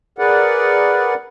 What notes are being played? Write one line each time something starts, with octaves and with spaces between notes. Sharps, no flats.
G#4 A#4 B4 D5 F#5